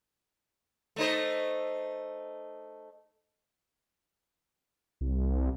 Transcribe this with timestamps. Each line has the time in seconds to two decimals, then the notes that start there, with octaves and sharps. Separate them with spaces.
0.96 A3 D#4 C5
5.01 C2